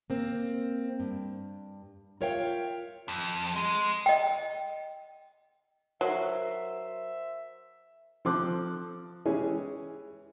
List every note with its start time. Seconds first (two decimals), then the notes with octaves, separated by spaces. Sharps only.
0.10 A#3 C4
1.00 G2
2.21 F4 A#4 C#5 E5 F5 G5
3.08 F2
3.56 G#3
4.06 D#5 G5
6.01 F#3 A#4 C5 E5
8.25 F3 C4 A4 C5 D6 F#6
9.25 E3 G#3 C#4 G4 G#4